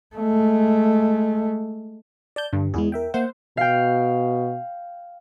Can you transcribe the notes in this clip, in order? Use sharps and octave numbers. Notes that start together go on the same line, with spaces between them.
G#3 A3
D5 A5 G6
G2 D3
E2 G#3 E4 G#4
A#4 E5 G5
A#3 C5 E5 F#5
B2 F5 G5